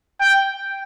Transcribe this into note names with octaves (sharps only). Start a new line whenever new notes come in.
G5